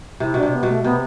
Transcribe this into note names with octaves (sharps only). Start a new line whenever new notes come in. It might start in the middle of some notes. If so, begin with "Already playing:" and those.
C3 E4
B2 D4
C3
B3
B2
A3
C3 B3